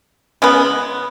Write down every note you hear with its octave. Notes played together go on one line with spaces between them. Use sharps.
C#3 G#3 B3